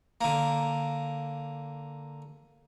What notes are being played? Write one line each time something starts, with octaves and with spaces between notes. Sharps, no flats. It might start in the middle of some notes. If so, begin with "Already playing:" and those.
D3 A#3